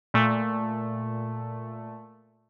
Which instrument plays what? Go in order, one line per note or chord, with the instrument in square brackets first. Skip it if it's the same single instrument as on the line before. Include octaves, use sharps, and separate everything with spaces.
[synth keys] A#2 A3